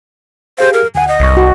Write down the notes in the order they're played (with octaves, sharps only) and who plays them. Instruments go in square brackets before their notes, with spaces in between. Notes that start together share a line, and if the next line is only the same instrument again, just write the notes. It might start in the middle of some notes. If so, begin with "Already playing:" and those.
[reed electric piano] G4 G#4 F5 [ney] C5
[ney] A#4
[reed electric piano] D2 F#5 [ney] G#5
[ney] D#5
[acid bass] C2 [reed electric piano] F#2 C#6
[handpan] F#4